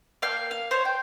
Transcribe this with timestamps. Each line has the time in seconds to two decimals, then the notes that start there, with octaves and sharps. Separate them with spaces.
0.22 A#3 F5 G5 F6
0.51 F5
0.71 C5 C#5
0.85 G5